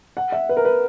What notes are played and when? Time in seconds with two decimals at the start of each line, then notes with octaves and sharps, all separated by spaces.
0.17 F#5
0.32 E5
0.49 B4
0.57 A#4
0.65 B4